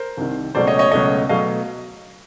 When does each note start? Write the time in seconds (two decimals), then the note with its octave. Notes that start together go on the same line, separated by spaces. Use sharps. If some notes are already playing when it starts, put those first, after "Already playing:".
Already playing: A#4 C5
0.17 C2 C3 D#3
0.55 C#2 B2 F#3 A3 C5 D5
0.67 C#5 D#5
0.79 C#5 D#5
0.91 C#2 B2 F#3 A3 C#5 D#5
1.29 B2 F#3 A3 D#5 F5